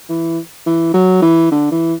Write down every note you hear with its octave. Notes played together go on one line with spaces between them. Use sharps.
E3
E3
F#3
E3
D3
E3